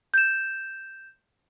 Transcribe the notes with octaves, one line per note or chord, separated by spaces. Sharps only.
G6 E7